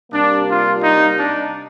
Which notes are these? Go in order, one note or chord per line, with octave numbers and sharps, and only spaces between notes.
C3 G3 A#3 D4
F4
D#4
D4